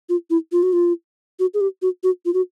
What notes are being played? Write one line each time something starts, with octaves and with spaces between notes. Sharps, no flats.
F4
E4
F4
F#4
F4
F#4
G#4
G4
F#4
F#4
F4
F#4